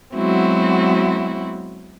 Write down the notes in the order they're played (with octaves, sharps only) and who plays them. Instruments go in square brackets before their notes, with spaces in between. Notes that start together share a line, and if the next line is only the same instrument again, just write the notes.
[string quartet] F#3 G#3 B3 C4 E4 F#4